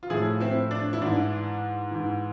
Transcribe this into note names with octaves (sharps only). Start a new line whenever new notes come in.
F4
A2 F3 E4 G#4
C4 E4
D4
E4
G#2 E3 D4
G#2 E3